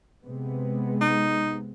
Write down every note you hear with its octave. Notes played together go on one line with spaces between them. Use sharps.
C3 G#3 B3
D#4